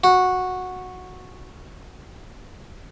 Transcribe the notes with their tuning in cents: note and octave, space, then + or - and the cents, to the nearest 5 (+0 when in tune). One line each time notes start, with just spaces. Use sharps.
F#4 -10